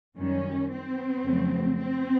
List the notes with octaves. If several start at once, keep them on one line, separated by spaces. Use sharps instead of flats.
F#2 D#3 G3 C#4
C4
F2 C#3 F#3 A3
C4